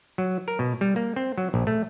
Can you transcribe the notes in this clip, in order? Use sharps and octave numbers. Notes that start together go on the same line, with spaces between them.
F#3
A#4
B2
G3
A#3
C4
F#3
A#1
A3